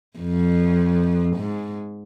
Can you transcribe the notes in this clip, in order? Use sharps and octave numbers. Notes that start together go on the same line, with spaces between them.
F2
G#2